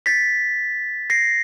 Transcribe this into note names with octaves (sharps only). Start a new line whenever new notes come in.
A6 B6
A#6 C7